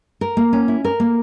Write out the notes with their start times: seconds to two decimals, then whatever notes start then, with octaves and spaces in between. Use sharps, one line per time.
0.21 A#4
0.37 A#3
0.53 C#4
0.68 E4
0.85 A#4
1.00 A#3